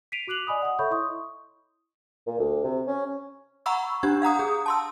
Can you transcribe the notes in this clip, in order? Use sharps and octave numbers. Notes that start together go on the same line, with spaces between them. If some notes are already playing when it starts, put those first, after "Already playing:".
B6 C7 D7 D#7 F7
F#4 D6 F#6 F7 F#7
D5 D#5 G#5 B5 D#6
F#5 D#6
A4 C#5 E5 B5 C#6 G6
E4 D#5 C6 C#6 D#6
A#2
D2
C3
C#4
F#5 A#5 B5 C#6 E6
D4 G4 G#6
F5 F#5 A#5 D#6
G#4
A5 C6 E6